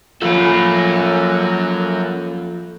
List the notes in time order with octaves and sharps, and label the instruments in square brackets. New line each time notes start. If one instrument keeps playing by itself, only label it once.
[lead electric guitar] F#2 C#4 [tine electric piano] F3 F4 [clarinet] A#3 [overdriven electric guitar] A4 B5